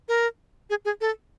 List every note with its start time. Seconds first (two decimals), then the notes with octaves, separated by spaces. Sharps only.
0.08 A#4
0.70 G#4
0.85 G#4
1.01 A4